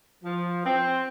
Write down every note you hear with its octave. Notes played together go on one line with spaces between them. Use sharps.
F3
C4